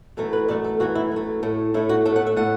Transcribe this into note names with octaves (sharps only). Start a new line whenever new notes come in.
F#2 E3 A3 A4
B4
F#2 E3 A3 D5
A4
F#2 E3 A3 F#4
E4
F#2 E3 A3
A2 A3
A2 A3 E4
F#4
A2 A3 A4
F#5
E5
A2 A3 F#5